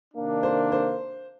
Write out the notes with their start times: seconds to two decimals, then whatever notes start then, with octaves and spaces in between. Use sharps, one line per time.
0.14 C3 D#3 A#3 D4
0.43 C5
0.72 C5